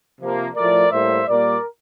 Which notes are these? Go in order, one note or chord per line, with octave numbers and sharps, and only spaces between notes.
C3 F3 A#3
A2 F3 A3 A#4 D5
A2 G3 A#3 C5 E5
A#2 G3 A#3 A#4 D5